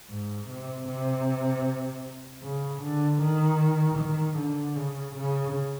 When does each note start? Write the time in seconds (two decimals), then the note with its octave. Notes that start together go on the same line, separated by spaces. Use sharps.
0.10 G#2
0.49 C3
0.88 C3
2.43 C#3
2.82 D3
3.22 D#3
3.98 D#3
4.38 D3
4.76 C#3
5.16 C#3